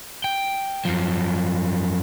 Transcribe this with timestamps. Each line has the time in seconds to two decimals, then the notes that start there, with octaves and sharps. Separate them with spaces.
0.24 G5
0.85 F#2 F3